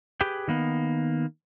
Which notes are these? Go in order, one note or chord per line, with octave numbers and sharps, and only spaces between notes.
G4 G#4 B4 G5
D#3 A#3 B3